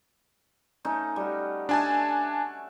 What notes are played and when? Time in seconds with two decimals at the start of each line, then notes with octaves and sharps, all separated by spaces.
0.85 A3 C#4 D#4
1.16 G3 F#4
1.69 A3 D4 F#4 E5 G#5 A5